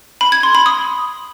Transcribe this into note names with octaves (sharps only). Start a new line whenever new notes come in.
B5
G#6
C6
B5
D#6